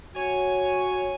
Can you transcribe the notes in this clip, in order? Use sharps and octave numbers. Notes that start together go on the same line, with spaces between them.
F#4 C#5 G#5